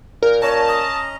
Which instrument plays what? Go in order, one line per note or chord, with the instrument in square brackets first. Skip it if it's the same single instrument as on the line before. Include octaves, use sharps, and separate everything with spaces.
[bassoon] A#2 [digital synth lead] A#4
[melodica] C#4 D#5 A#5 [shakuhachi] C#5 [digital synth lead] A5
[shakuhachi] D#6